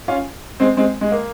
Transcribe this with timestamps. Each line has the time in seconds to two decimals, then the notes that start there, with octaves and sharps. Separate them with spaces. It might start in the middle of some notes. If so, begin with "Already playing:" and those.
0.08 C#4 F4
0.60 G#3 C4
0.77 G#3 C4
1.01 G#3
1.11 A#3